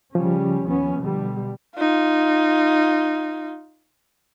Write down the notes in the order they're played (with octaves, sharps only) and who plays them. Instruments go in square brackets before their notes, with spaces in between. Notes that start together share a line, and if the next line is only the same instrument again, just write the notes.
[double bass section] C#3 G3 C#4 [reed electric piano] F3
[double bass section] D#2 B3 C#4
B2 D3 G3
[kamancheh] D#4 F4